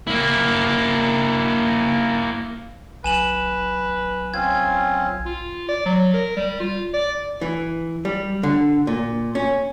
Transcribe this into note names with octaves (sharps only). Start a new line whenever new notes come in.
A#3 E4
B1 B4 G#5 E7 F#7
C4 C#4 F4 G#6
F4
D5
F#3
A#4
G3
F4
D5
E3
G3
D3
A#2
C#4